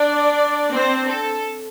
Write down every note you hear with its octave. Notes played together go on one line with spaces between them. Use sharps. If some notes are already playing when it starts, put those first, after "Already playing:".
Already playing: D4 D5
C4 C5
A4